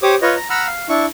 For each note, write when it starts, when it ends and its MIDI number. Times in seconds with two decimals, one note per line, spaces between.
0.03 0.15 67
0.03 0.15 72
0.03 0.15 73
0.03 0.15 86
0.03 0.15 87
0.22 0.35 65
0.22 0.35 71
0.22 0.35 73
0.22 0.35 75
0.36 0.48 82
0.50 0.67 78
0.50 0.67 82
0.50 0.67 83
0.50 0.67 88
0.50 0.67 89
0.67 0.86 77
0.89 1.06 62
0.89 1.06 64
0.89 1.06 85